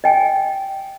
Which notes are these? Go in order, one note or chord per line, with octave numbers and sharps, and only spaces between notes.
D#5 G5 G#5